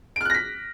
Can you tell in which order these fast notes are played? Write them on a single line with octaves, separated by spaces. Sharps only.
D7 F6 F#6 A#6 B6